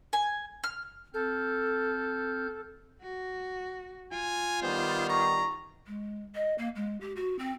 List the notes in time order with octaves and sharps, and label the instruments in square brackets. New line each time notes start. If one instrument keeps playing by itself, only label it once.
[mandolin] G#5
F6
[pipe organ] C4 F6 G6 [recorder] A4
[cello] F#4
[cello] F4 [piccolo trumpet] G#5
[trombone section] D#3 G3 B3 [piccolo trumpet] C5
[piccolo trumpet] A#5 [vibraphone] C#6
[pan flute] G#3
D#5
A#3
G#3
G4
F#4
C4